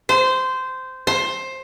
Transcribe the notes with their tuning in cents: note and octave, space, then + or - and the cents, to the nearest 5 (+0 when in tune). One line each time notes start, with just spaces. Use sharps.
C5 -15
C5 +15